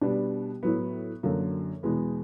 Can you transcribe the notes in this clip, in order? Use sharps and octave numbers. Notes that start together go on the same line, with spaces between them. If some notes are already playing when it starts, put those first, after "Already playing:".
B2 G3 B3 D4
A2 F#3 B3
F#2 D3 F#3 A#3
E2 B2 G#3 B3